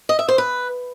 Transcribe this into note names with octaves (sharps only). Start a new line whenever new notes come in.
D#5
E5
C5
B4